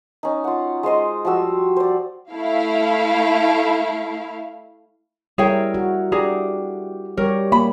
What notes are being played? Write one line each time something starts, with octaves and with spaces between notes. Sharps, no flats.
C#4 D#4
F4 F#5
G#3 F4 C5 D#5
F3 G3 F#4 E6
C5 D5
A3 E4 F5
G3 E4 G#4 A#4 C#5 G5
F#4
D4 G4 G#4 A#5
G3 G4 A#4 C#5
A#3 B5